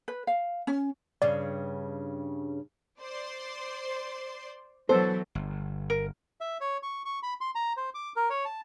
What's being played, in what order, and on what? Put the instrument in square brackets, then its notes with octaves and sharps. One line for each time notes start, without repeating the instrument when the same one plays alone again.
[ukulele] B4
F5
C#4
[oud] G2 C#3 [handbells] D5
[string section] C5 D5 C6
[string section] E3 F#3 [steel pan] B3 A4 [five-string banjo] C5
[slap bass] G1
[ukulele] A#4
[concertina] E5
C#5
C#6
C#6
B5
C6
A#5
C5
D6
A#4
C#5
A5